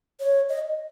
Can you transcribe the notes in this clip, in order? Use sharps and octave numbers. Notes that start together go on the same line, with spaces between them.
C#5
D#5